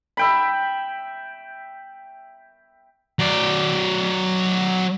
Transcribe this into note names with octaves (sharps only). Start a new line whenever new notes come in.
E5 G5 B5
F#3 D5